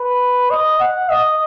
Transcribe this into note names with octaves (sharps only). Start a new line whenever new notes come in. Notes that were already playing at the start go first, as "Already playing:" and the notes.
Already playing: B4
D#5
F#5
D#5